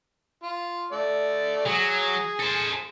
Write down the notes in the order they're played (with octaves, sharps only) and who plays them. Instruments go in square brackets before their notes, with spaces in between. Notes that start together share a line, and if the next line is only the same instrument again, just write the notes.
[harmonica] F4
A3 D5
[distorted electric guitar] F#3 [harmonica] G#4 G#5
[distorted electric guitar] A4 C5